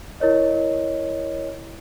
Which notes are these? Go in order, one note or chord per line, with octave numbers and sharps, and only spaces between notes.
E4 A#4 C#5 D#5